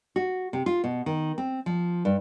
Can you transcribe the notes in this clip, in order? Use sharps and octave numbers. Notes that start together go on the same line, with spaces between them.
F#4
C3
F4
B2
D#3
C4
F3
G2